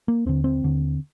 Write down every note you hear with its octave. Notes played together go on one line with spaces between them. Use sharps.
A#3
D#2 D3 C4
C4
D#2 D3